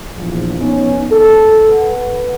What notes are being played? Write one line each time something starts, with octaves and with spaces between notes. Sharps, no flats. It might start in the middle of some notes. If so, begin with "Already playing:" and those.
A#1 E2 F3
B3 C#4 D#4
A4
B4 F#5